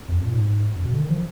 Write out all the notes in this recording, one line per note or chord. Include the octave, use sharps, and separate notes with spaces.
F2
F#2
A#2
G#2
F#2
B2
D3
D#3
F3